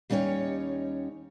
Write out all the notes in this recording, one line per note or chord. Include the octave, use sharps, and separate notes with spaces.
D#2 G3 C#4 D#4 C#5